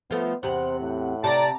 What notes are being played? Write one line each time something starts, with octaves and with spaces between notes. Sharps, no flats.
F3 A3 B3
E2 C3 C5 F#5
A2
C3 D5 A5 A#5